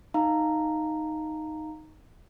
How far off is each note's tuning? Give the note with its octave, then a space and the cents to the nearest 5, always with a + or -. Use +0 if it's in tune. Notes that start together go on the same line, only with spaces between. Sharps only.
D#4 +0 F5 +0 A#5 -10